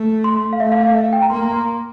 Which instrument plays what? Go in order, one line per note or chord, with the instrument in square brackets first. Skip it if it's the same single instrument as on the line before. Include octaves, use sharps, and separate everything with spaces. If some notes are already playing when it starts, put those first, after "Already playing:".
Already playing: [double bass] A3
[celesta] C6
F5
[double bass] A3 [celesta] E5
[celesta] F5
F5
E5
F5
G5
A#5
[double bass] A#3 [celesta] C6
[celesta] A#5
C6
C6